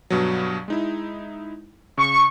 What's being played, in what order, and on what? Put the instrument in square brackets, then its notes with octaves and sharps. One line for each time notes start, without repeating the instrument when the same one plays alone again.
[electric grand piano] G2 B2 F#3
G#3 D#4 E4
[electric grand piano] C#3 [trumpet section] C#6